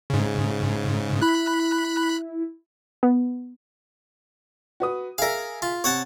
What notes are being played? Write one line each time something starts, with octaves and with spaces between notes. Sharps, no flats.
G#2 C#3
E4 B5 F#6
B3
F#4 B4 D#6
G#4 A#4 E5 F5
F4
C3 C#5 F#5 A5